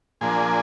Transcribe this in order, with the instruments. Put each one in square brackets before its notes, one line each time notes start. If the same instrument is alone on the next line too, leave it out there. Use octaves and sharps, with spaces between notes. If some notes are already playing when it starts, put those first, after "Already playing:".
[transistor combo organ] A#2 F3 A#3 D4 G#4 G#5